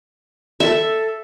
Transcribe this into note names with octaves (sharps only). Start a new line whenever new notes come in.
A4 E5